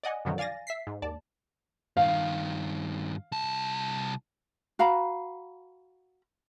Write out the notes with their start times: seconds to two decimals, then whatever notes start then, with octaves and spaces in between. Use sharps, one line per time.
0.03 D5 D#5 F#5 G#5
0.25 F#2 B2 D3 D#3 F3 F#3
0.38 D5 F5 G#5 A6 A#6
0.67 E5 B6 C7
0.87 G#2
1.02 D#2 D5 A5
1.97 G2 D#3 F5
3.32 C2 A5
4.79 F#4 F5 A#5 B5